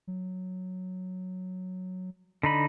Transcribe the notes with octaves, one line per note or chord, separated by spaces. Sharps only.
F#3
D3 D#4 B5